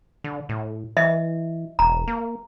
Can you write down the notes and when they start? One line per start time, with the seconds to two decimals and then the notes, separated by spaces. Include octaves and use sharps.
0.24 D3
0.49 A2
0.97 E3 D#5 E5
1.79 E1 A#5
2.07 A#3